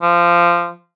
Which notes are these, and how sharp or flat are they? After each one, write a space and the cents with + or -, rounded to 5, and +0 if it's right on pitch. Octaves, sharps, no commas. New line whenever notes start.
F3 -15